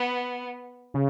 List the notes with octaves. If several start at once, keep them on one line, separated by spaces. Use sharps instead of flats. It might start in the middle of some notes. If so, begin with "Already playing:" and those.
Already playing: B3
C#3